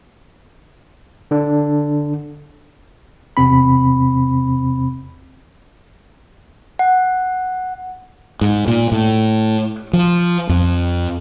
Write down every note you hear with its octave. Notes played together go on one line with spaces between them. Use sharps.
D3 D4
E2 C3 C4 B5
F#5
G#2
A#2
A2
F3
F2